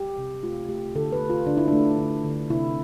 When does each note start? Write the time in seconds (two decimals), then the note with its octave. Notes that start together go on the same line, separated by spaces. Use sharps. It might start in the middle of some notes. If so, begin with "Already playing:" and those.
Already playing: G4
0.18 C3
0.43 A3 F4
0.69 A3 G4
0.96 D3 A4
1.12 B4
1.21 A3
1.30 F4
1.47 D3 D4
1.57 E4
1.68 A3 D4
1.98 D3
2.24 D3
2.50 C3 E4